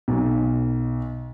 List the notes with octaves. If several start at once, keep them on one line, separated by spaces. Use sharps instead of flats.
B1